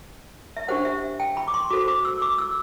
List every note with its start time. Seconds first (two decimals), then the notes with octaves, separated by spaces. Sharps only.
0.57 E5
0.68 D4 G4 C5 F#5
0.85 E5
1.20 G5
1.37 B5
1.48 D6
1.54 C6
1.70 F#4 A4 C5 D6
1.88 D6
2.05 E6
2.22 D6
2.38 E6